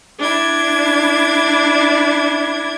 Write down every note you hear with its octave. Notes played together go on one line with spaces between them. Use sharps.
D4 E4 G#6